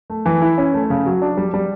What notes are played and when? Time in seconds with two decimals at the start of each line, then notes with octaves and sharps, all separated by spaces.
0.10 A3
0.26 E3
0.42 E4
0.58 C#4
0.74 A3
0.90 C#3
1.06 F#3
1.22 D4
1.37 G3
1.54 G3